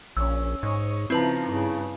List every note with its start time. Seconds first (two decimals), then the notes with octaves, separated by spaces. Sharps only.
0.17 A#1 C#4 E6
0.63 G#2 C#5 D#5 C#6
1.10 C#3 F3 C4 D#4 E4 B4 A5
1.48 G2 C#3